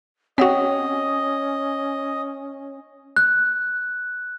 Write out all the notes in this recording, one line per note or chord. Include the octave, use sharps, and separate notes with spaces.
C4 C#4 F#4 C#5 D#5 F#5 G5
F#6